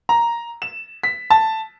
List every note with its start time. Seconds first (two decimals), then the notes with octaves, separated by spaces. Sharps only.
0.09 A#5
0.62 E7
1.03 B6
1.30 A5